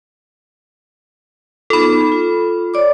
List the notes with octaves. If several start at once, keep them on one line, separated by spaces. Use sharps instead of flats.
B3 D#4 F4 A4 B5
F4
C#5 D5 D6